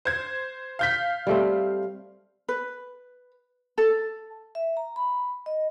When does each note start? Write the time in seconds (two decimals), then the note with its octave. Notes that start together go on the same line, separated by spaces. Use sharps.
0.05 C5 G#6
0.79 F5 G6 B6
1.27 G3 A3 C4
2.49 B4
3.78 A4
4.55 E5
4.77 A#5
4.96 B5
5.46 D#5